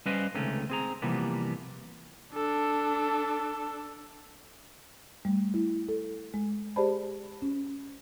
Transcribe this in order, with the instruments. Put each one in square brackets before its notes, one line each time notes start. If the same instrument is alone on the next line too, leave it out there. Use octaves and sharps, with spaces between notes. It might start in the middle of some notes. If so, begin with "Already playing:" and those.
[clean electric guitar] G3 C#4 B4 C5 D#5 F5
C#2 C3 D#3 A3 C#4
C4 G#4 A#5
C3 E3 F3 G3 A#3 B3
[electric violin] D4 A4
[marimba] G3 A3
E4
A4
G#3
G4 G#4 C5 D5 A5 B5
C#4